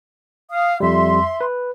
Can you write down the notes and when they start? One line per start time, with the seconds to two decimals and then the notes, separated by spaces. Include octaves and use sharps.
0.50 F5 D#6
0.80 F2 G3 E5 C6
1.41 B4